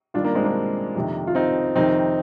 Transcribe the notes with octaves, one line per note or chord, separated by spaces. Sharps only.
G2 D#3 D4 F4
A#3 D4
G#3 C4
A#3 D4
F2 C3 D#3
F4
C4 D#4
F2 C3 D#3 C4 D#4